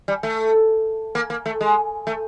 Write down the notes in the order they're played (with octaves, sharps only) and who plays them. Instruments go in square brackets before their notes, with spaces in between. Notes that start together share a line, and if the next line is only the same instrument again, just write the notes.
[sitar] G3
A3
A#3
A#3
A3
G#3
A3